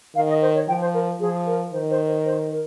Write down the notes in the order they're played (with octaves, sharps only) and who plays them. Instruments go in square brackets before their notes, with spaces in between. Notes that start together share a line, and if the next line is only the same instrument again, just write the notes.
[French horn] D#3 [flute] F5
[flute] D#5
C5
C#5
[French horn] F3 [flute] G5
[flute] C5
A#4
[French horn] F3 [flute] G#4
[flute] A#4
[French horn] D#3 [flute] C5
[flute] C5
C5
C5
A#4